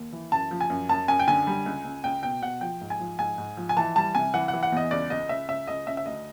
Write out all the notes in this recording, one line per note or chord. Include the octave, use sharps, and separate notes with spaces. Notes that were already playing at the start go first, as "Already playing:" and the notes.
Already playing: D#2
E3
F#2 A5
F3
G#5
F#2
F#2 A5
F#2 G#5
G5
D3 G#5
G3
C#2
C#2
C#2 G5
B2 G5
B2 F#5
F3 G5
G#2
G#5
F3
G#2 G#5
G#2
F3
G#5
E3 A5
G3 A5
C3 G#5
E3 F#5
F#5
E3
F#5
E2 D#5
C#2 D5
C#2 D#5
C#2 E5
C#2 E5
C#2 D#5
C#2 E5
E5
D2 D#5